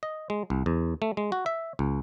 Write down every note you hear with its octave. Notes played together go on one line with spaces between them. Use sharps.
D#5
G#3
C2
E2
A3
G#3
F#4
E5
C#2